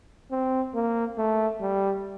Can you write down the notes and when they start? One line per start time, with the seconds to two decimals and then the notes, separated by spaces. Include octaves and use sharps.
0.32 C4
0.75 A#3
1.18 A3
1.61 G3